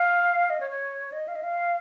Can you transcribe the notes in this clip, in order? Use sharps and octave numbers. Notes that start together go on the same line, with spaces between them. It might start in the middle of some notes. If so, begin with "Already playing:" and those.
Already playing: F5
D#5
C#5
C#5
D#5
F5
D#5
F5